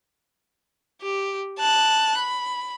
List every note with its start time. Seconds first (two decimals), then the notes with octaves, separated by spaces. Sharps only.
1.02 G4
1.59 A5 F#6
2.18 B5